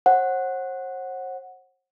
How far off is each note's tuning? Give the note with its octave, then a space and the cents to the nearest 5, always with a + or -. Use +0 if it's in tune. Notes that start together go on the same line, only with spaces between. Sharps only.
C5 +45 F#5 +0